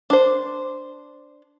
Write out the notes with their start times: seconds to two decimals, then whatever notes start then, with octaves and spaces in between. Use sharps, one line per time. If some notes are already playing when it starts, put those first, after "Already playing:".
0.10 D4 C5